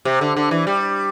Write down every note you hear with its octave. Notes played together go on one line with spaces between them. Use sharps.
C3
D3
D3
E3
G3